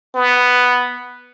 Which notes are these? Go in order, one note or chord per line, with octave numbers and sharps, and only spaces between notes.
B3